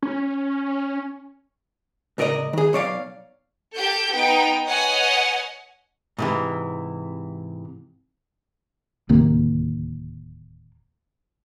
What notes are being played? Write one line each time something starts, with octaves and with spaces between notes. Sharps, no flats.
C#4
C#2 A2 A#4 D5 D#5
D#3 G#4
B1 C#5 D5 F5
G4 A4 G6
B3 D#4 G5
B4 C#5 D#5 F#5 G#5
G#2 C3 E3
D1 D#2 C3 A#3